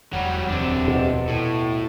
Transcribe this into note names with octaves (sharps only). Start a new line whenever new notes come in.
E1 F#3 G3
D#1 F2 C3 D4
B2
A2